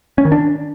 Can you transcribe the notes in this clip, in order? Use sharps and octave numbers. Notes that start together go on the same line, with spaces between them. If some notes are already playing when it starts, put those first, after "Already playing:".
C#4
D#3
D4